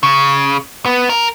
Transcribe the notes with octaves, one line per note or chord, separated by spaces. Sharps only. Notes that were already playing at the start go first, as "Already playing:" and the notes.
C#3
B3
A#4